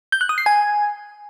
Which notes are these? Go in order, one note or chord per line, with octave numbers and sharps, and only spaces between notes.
G6
F#6
D#6
C7
G#5